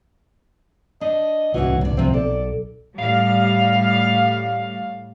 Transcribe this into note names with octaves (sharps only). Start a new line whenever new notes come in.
D4 D#5
D1 C2 E3 C#4 D#4 F#4
G2 D5
C3 F3 C4
B1 A4 D5
A2 G3 F5